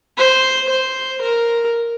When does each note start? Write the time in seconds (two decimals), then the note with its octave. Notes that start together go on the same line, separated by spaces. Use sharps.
0.17 C5
0.69 C5
1.21 A#4